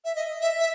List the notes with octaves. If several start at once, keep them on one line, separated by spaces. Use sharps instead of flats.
E5
D#5
E5
E5